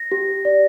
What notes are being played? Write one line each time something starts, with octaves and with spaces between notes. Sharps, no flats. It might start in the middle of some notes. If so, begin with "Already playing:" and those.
Already playing: A#6
G4
D5